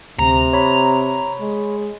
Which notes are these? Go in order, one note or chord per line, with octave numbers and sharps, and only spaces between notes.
D2 C3 A#5
C#5 B5
G#3